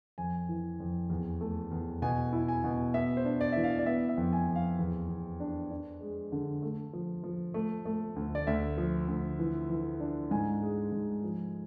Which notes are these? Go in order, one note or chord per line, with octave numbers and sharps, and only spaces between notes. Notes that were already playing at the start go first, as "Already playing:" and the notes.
F2 G#5
E3
F2
E2
A3
E2
B2 G#5
E4
G#5
B2
B3 E5
C5
D4
D5
E3 E5
F5
D5
B3 E5
E5
F2
G#5
F2
F5
E2
E2
D4
D4
G#3
D3
A3
F3
F3
A3
A3
D2
D5
D2 E5
F3
D2
E3
E3
D4
G#2 G#5
G#3
G#2
F3